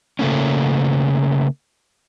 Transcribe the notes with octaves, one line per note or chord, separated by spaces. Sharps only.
C#3 A3 A#3 C#4